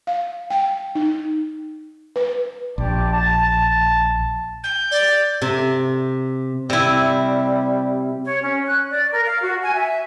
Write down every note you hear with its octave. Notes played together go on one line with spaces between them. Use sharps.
F5
G5
D#4
B4
A#1 G4 D5 A5
A5
G6
D5
C3
C3 G3 E4
C#5
C#4
F#6
D5
A#4
F5
F#4
G#5
E5